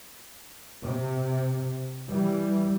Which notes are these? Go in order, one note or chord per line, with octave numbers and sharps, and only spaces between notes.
C3
E3 G3